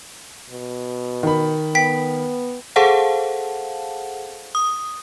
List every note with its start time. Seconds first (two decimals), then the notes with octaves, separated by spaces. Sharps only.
0.50 B2
1.23 D#3 B5
1.75 B3 G5 B6
2.76 G#4 A4 C5 F5 F#5 A5
4.55 D#6